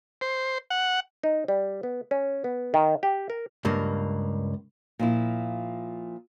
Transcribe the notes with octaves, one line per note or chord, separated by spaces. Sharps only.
C5
F#5
D#4
G3
B3
C#4
B3
D#3
G4
A#4
C#2 G2 A#3
A#2 F3 E4